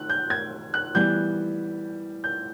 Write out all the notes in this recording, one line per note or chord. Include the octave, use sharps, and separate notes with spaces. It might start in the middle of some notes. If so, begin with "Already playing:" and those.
Already playing: D#3 F#6
G6
G#6
F#6
E3 G3 B3 G6
G6